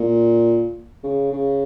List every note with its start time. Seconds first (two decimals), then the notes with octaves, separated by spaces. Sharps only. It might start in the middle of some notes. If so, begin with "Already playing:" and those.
Already playing: A#2
1.04 C#3
1.32 C#3